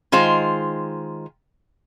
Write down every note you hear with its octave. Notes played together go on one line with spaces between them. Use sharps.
D#3 G#3 F4 C5